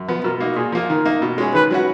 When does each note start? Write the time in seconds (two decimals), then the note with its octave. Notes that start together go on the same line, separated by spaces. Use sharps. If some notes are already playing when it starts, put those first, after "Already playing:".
Already playing: F#2
0.08 F3 B3
0.24 B2 A#4
0.40 A#3 D#4 F#4
0.56 A#2 G#4
0.72 F3 A#3 F4
0.90 D#3 A#4
1.05 A#3 D#4
1.22 B2
1.38 G#3 C#4 G#4
1.54 D#3 B4
1.71 F#3 C#4 F#4